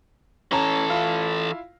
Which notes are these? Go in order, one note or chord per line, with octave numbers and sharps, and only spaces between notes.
E3 C#4 A4 A#5
E4 F4 F5